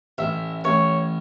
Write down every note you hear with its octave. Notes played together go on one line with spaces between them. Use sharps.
A1 E5
A1 C#5